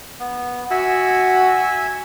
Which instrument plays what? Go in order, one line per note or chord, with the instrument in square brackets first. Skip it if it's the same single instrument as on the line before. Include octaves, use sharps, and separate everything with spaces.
[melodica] B3
[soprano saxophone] F#4 [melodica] E5 G#5 E6